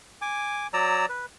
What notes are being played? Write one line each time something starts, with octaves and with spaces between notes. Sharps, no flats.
G#5 D6
F#3 D5 A#5 E6
B4